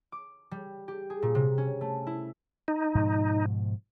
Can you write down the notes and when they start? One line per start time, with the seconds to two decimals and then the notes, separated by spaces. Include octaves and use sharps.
0.12 D6
0.51 G3
0.88 G4
1.10 G#4
1.22 A#2
1.35 C3
1.58 C#4
1.81 A3
2.07 E4
2.68 D#4
2.95 G#2 B2 F3